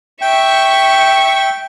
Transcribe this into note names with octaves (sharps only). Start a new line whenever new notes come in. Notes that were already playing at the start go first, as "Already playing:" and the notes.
E5 G5 C#6